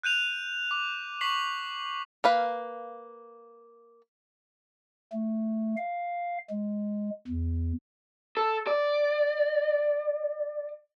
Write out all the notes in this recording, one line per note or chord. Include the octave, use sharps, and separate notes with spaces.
F#6 G6 D#7 F7
D6
C#6 B6 C7 F#7
A#3 B4 F5
A3
F5
G#3
E2
A4
D5